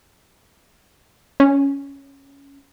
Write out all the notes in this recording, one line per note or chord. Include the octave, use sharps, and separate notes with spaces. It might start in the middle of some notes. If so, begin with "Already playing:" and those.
C#4